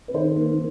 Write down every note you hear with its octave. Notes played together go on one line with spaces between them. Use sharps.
B4
D#3 C5
A#3